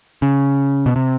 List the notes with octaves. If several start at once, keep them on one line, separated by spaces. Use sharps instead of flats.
C#3
B2
C3